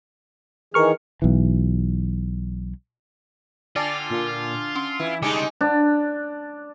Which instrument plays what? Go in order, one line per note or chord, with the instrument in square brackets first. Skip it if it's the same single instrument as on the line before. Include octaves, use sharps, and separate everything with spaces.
[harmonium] D#3 E3 G#4 [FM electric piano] A#4 C#6 F6
[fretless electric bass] B1 E3
[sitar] D3 [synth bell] D4 G#5 A5 [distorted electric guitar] F4 [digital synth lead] D5
[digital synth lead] A#2
[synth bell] C#4 [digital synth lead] C6
[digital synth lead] E3 [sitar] E4
[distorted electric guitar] C#3 D4 [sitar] G3 G#3 D#4 [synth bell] G#5 C#7 [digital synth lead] D6
[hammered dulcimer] D4